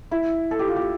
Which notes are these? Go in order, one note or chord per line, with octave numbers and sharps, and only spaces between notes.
E4
A4
G4
F4
G4